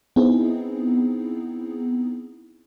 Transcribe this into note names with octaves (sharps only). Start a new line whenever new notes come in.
B3 C4 D#4 E4 G#4